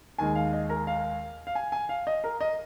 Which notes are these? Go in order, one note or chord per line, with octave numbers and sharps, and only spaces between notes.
D#2 D#3 G#3 G#5
F5
D#5
A#4
F5
F5
G#5
G#5
F5
D#5
A#4
D#5